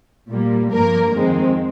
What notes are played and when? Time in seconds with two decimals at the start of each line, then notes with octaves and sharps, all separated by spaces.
0.30 A#2 G3 A#3
0.71 G2 F3 A#3 A#4
1.13 F2 D#3 G#3 C4